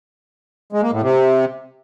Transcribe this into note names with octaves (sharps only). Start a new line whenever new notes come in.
G#3
A#3
A2
C3